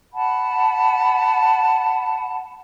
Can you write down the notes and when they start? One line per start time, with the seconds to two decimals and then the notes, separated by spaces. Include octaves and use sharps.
0.14 F#5 A5 B5